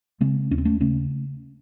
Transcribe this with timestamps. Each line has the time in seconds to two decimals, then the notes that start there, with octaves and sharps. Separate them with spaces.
0.21 C#3 G#3 C4
0.51 D#2 C#4
0.58 C4
0.65 A3 C#4
0.80 C#3 A3 C#4